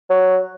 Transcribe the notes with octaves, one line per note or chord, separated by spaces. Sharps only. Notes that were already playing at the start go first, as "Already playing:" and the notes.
F#3